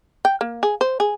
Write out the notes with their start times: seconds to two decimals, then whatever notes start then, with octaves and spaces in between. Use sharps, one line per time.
0.25 G5
0.41 A#3
0.63 G#4
0.81 C5
1.00 G#4